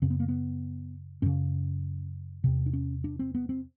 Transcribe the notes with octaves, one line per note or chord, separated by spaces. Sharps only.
F#2 C#3 C4
B3
A#3
B3
F#2 C#3 C#4
E2 C3
D4
C#4
D4
C4
B3
C4